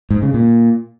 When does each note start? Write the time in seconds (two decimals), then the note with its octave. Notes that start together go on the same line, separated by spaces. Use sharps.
0.11 G#2
0.22 C#3
0.34 A#2